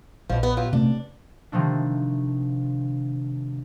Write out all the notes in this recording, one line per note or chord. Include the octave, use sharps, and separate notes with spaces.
A#1 B2 F3
B3
F#3 F4 G4
C3 A3 C#4 D4
C3 D#3 F3 A3 D4